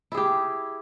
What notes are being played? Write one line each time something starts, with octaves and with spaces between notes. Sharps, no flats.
E4 G4 G#4